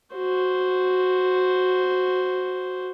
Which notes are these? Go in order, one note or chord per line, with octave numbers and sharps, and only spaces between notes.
F#4 C5